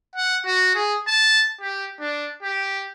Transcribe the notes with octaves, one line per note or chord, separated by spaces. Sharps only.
F#5
F#4
G#4
A5
G4
D4
G4